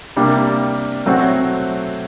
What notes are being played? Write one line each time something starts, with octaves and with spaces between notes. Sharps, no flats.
C3 G3 A#3 D4
F#3 A3 C4 F#4